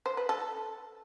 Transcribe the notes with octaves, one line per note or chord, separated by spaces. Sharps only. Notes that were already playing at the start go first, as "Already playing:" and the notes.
C5
B4
A4